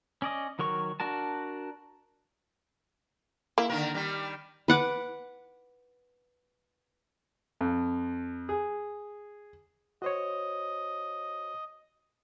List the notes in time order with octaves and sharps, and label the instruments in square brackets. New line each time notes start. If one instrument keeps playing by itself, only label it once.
[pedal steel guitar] C#4 D5 D#5
D#3 F#3 A#4 C#6
D4 F#4 A#4 A5
[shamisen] A#3 [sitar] E4
[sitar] D3 D#3 A#4
D#3 G3
[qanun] B4 F#5 D6
[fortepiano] F2
G#4
[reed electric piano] F#4 C5 C#5 [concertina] D#5